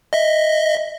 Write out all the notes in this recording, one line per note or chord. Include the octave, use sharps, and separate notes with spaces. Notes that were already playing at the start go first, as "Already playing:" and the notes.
D#5 E5